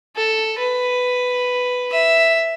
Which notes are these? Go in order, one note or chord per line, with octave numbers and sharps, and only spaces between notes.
A4
B4
E5